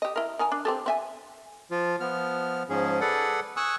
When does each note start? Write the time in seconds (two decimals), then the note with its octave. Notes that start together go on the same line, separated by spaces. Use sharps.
0.02 G4 D#5
0.16 E4 A#4
0.39 D#3 A#4 G#5
0.52 D4
0.65 C4 G4 A4
0.86 C4 E5 G#5
1.71 F3 F4
2.00 F3 B3 F6
2.69 G#2 F3 C#4 G#4
3.01 G#4 A4 B4 D5 F#5
3.57 G#5 C#6 D#6 E6 F#6